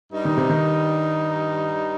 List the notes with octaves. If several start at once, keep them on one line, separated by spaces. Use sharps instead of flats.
G2 G3 D#4
D#3
C3
D#3